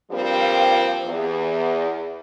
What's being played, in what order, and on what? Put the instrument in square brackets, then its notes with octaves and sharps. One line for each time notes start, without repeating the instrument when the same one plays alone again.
[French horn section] G2 F3 G3 A#3 C4
E2